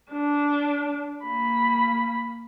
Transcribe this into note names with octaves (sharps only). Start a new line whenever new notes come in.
D4
A#3 B5